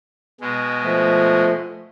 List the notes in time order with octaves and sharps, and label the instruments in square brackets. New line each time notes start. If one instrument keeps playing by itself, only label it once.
[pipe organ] B2 G#3
[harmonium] F3 A3